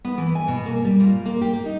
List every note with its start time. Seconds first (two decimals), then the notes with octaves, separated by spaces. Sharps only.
0.05 B3
0.18 E3
0.35 G#5
0.48 B2
0.66 A#3
0.85 G3
1.00 A#2
1.25 A#3
1.41 G4
1.53 A#3
1.66 D#4